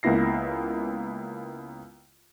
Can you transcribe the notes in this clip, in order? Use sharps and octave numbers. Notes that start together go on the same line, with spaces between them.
C#2 A#3 B3 E4 A#6 C7